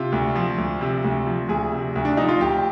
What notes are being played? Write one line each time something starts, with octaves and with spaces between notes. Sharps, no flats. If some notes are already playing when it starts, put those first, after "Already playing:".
Already playing: C3 F4
D2
F3
D2
C3
D2
F3
D2 G#4
C3
D2
D4
F3 D#4
F4
D2 G4